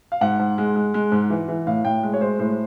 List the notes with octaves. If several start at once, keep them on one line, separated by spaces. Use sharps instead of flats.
F5
G#2 F#5
G#2
G#3
G#3
G#3
G#2
E3
E3
A2 F5
A2 G5
G#3
C#5
G#3 C5
A2 C5